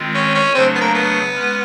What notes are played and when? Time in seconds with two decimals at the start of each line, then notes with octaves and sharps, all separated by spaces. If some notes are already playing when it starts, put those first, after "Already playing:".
Already playing: D#3 G#3 C4 F4
0.14 C#4
0.34 C#4
0.54 C#3 F#3 A3 C4 D4
0.75 B3
0.81 A#3
0.94 B3
1.34 G#3 C#4